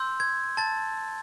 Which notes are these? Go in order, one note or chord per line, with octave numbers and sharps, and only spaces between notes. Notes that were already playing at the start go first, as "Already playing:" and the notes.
Already playing: C6 E6 G6
G#6
A5 A6